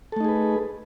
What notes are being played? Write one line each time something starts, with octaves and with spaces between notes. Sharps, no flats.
A3 D#4 G#4 A4 B4